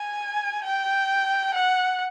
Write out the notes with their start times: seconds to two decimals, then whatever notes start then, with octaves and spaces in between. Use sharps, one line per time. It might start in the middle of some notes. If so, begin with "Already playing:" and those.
Already playing: G#5
0.64 G5
1.54 F#5